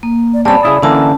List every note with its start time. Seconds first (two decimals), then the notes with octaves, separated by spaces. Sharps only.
0.03 A#3
0.34 D5
0.45 G3 C4 C#4 D5 A5 B5
0.63 C#3 E4 A5 D#6
0.82 D3 E3 A#3 C#4 A5 E6